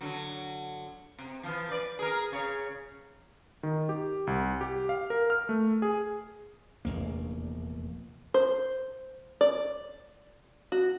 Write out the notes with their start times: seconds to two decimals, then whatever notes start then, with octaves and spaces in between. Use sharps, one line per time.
0.01 D3 F#3
1.19 C3
1.43 E3 F3
1.69 B4 D5
1.99 G#4 A#4
2.32 C#3 C#5
3.63 D#3
3.89 G4
4.27 C2
4.61 G4
4.89 F5
5.10 A#4
5.30 F6
5.49 A3
5.82 G#4
6.85 F1 A#1 E2 A#3
8.34 C5
9.41 D5
10.72 F#4